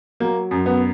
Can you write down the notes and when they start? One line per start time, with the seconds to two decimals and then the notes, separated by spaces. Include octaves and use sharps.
0.20 F#3 A#3
0.51 F#2
0.66 B3